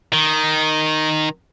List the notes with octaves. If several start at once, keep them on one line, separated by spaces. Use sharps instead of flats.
D#3